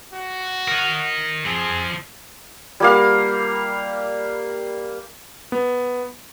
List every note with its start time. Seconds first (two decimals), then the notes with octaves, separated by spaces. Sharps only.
0.13 F#4
0.68 A#4 D#5
1.45 F3 C4 G#4
2.80 G3 A#3 F5
5.52 B3